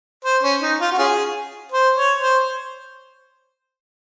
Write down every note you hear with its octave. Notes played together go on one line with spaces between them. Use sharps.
C5
C#4
D#4
F4
F#4
C#4 F4 G#4
C5
C#5
C5